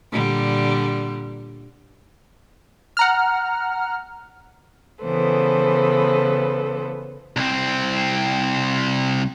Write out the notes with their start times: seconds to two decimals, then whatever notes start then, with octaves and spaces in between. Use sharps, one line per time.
0.12 A#2 D3 G3
2.97 F#5 A#5 F6
5.03 C#3 E3 B3 A4 B4 C5
7.37 C2 C4